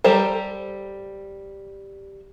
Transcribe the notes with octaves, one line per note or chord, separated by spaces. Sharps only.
G3 G4 A4 C5 A#5